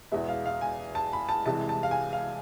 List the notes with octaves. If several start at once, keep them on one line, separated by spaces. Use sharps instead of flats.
E2 B2 G#3 B3 E5
F5
F5
G#5
A5
B5
A5
C2 C3 E3 G#3 A5
A5
F5
G#5
F5